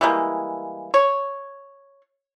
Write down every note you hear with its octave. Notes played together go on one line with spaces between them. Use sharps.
E3 G3 G#3 A#3
C#5